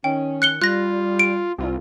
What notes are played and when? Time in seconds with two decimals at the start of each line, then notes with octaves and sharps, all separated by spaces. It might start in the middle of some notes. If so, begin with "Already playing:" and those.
0.04 D#3 C#4 G5
0.42 F#6 C#7 G7
0.62 G3 F4 F#6 A#6
1.19 D7
1.58 C2 C4 F4